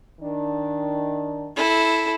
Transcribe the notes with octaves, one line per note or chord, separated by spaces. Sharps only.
D#3 D4
E4 A4